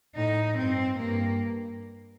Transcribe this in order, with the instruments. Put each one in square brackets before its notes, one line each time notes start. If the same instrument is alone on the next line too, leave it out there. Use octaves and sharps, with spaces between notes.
[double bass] A2 [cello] D#4
[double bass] G2 [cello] C4
[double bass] G2 [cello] A#3